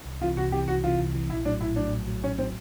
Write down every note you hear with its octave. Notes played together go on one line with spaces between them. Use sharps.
C2
C3 E3 F4
C2 F#4
C3 E3 G4
C2 F#4
C3 E3 F4
C2
C3 E3
A#1 E4
A2 F#3 D4
A#1 E4
A2 F#3 D4
A#1
A2 F#3
A#1 C#4
A2 F#3 C4